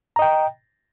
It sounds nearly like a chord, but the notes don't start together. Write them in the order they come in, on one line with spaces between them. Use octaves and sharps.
A#5 D#5 G5